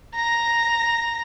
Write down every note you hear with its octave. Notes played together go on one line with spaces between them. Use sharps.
A#5 A#6